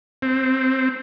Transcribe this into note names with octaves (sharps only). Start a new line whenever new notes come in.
C4